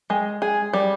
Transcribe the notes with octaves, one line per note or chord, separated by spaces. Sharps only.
G#3
G#4
G3